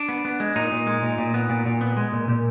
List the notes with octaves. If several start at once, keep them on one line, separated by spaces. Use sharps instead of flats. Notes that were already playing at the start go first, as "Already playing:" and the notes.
Already playing: D4
B3
B3
G#3
A#2 D#4
A#2
G#3
A#2
A#2
B3
A#2
A#2
B3
G#3
A#2
A#2